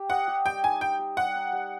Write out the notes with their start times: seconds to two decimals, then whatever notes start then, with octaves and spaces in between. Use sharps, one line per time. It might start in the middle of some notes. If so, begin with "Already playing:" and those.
Already playing: G4
0.10 D#5 F#5
0.28 G4
0.45 G3 G5
0.64 D#4 G#5
0.81 G4 G5
0.99 G4
1.17 G3 F#5
1.35 D#4
1.53 G3